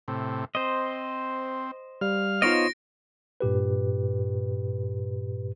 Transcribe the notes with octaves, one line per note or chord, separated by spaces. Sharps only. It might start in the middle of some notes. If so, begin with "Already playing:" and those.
A2 C3
C4 C5 D#5
G3 F5 F6
B3 D#4 F4 C5 C#5 D#5 A#6 D7
G2 A#2 G4 B4